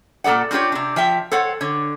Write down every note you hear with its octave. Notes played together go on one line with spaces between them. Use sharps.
A#2 A#3 A4 D5 F#5
C4 D4 F4 G4 C#5
C3 D4
F3 E5 G5
A4 C5 C#5 F#5
D3 C#5